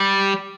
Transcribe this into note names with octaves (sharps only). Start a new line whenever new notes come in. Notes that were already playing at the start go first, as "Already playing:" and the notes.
Already playing: G3